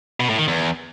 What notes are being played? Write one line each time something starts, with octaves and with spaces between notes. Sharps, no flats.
B2
A2
D#3
E2